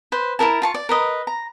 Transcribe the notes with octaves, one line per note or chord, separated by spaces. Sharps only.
B4 C5
E4 F4 A#4 A5
F4 A5 C#6
D5
A#4 B4 D#5
A#5